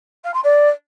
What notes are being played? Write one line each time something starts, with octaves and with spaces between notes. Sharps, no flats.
F5
C6
D5